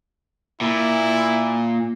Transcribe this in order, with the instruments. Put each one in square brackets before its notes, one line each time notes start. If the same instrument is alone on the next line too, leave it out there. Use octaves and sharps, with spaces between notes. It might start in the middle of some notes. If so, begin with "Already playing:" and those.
[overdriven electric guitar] A#2 [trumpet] E4